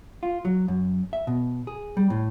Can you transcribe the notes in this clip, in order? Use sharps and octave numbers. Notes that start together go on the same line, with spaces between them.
F4
F#3
F#2
E5
B2
G#4
G3
A2